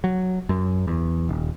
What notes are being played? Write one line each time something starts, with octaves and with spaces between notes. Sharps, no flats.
F#3
F#2
E2
D#1